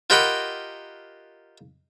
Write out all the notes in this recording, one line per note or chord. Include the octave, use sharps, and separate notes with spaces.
F4 G4 A#4 D#5 F#5 B5